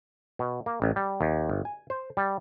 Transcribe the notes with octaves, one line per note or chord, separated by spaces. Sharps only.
B2
A#3
A1
G3
D#2
G1
G#5
C5
G3